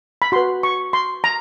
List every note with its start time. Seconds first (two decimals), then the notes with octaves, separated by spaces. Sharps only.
0.22 B5
0.32 F#4 B4 C6
0.63 C#6
0.93 C6
1.24 A#5